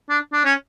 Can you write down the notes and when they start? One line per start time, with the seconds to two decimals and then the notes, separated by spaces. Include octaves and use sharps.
0.10 D4
0.33 D4
0.45 C#4